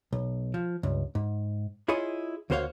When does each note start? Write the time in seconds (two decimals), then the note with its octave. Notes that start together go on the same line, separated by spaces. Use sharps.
0.13 B1
0.54 F3
0.83 C#2 G2
1.15 G#2
1.88 E4 F4 G#4 C#5 D#5
2.50 D2 A#3 F#4 C5 C#5 F5